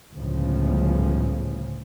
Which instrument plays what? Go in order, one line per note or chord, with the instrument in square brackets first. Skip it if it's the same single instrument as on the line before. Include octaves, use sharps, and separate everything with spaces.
[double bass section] G1 C#2 A2 C#3 F3